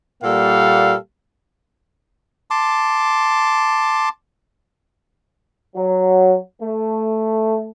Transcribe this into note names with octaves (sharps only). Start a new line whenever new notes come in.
A#2 G3 A#3 A4 F5 F#5
A5 C6 D6
F#3
A3